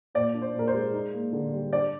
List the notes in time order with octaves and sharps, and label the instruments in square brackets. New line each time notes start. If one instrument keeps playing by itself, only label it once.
[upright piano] A#2 D5
D4
C5
A#2 A#4
C5
G#3
D#4
A#3
D3
G3
D4 D5